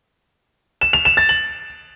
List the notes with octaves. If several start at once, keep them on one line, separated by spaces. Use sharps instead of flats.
E7
F7
E7
A6
F#7